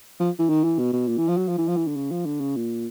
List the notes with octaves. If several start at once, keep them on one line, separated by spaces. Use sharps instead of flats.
F3
E3
D#3
E3
B2
B2
A#2
E3
F3
F#3
F3
E3
F3
E3
D3
C#3
F3
D3
C#3
A#2